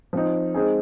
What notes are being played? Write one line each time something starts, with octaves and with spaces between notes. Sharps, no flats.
F3 C4 D#4
G#3 C4 D#4 G#4